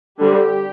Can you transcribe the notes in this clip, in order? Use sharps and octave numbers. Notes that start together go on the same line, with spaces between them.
D3 G3 C4 G4